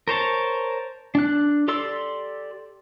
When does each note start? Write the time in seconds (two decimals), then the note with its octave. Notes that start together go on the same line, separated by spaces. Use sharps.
0.08 A#4 C5 C#5 A5
1.15 D4 F#6
1.68 G4 A4 D5 C6 E6